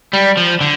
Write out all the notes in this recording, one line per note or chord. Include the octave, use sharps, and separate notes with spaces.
G3
F3
D3